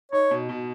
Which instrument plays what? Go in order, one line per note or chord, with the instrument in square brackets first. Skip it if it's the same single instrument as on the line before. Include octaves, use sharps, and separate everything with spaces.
[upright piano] D#4 [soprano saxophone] C#5
[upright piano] B2
B2